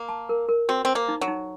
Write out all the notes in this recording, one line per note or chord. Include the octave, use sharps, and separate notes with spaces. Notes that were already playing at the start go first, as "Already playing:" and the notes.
Already playing: A#3
A5
A#4
A#4
C4 F#4
C4 C5
A#3
D#4
F#3
D#4